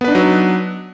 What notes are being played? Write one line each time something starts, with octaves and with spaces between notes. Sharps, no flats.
F#3 B3 D4 D#4 B4